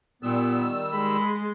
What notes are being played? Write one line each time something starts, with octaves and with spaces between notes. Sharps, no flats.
A#2 D#3 G3 B3 E6
G#3 B5